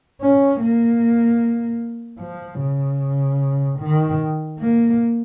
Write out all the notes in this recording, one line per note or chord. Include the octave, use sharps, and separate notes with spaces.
C#4
A#3
F3
C#3
D#3
A#3